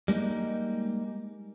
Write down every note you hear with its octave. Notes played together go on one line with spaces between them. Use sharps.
G3 G#3 A#3 D#4